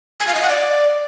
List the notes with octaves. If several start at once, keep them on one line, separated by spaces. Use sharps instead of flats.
G#5
F5
D#5
F#5
D5